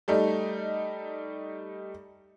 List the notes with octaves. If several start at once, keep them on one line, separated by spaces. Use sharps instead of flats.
G3 A3 D#4